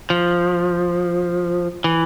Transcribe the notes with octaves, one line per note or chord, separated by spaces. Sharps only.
F3
E3